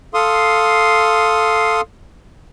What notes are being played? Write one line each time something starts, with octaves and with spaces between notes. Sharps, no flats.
A4 F5 C6 D#6